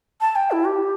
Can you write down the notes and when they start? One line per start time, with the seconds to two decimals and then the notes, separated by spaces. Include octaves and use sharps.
0.21 A5
0.36 G5
0.51 E4
0.67 G4